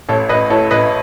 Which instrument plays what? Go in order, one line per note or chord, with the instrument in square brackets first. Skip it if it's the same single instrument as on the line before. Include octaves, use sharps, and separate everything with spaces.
[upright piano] A1 A4 C#5
A1 B4 D#5
A2 A4 C#5
A1 B4 D#5